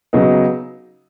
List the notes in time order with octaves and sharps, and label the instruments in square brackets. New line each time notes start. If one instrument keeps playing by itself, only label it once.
[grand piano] C#3 F#3 B3 D#4